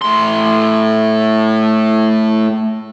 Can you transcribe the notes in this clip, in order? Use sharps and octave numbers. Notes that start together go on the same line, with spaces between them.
A2 C6